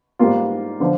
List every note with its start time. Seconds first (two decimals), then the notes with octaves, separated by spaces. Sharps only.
0.19 G#2 G3 A#3 F4
0.80 D3 F3